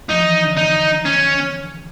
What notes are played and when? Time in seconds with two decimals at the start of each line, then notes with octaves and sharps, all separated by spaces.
0.10 F3 D#4
0.22 E3
0.34 D#3
0.46 D3
0.57 D#4
1.05 C#4